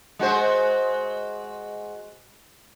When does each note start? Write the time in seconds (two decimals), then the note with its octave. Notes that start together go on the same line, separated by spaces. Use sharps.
0.19 G#3 F#4 C5